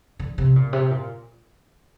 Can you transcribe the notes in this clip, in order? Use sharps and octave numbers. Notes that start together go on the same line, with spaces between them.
D3
C3
A#2
C3
A#2